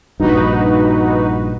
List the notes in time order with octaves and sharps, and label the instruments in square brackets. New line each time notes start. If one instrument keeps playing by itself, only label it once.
[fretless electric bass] A#1 G2 [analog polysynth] D#4 F#4 B4